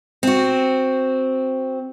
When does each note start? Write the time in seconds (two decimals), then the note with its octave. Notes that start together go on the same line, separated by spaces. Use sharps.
0.23 C4 F#4